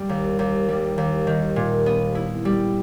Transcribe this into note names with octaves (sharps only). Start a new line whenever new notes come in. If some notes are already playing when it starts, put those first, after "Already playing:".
Already playing: G3
D#2
D#2
G3
D#2
D#3
A#2
B3
E4
G3